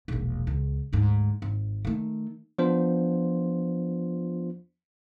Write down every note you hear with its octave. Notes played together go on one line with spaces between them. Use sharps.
E1 A#1
C#2
D2 G#2
G#1
D#3 A3
F3 B3 D4 F4 C5